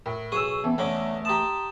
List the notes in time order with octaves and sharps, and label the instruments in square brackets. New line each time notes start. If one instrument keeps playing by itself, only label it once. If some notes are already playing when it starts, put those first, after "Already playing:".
[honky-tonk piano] A2 [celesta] A#4
[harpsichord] B1 G#4 [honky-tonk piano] C#6 E6 [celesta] D#7 E7
[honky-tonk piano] E3 C4 [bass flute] B3 [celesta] A5
[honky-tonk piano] E2 [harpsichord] D3 C#4 D6 [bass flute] A3
[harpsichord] G4 A5 [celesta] A#5 C6 D#6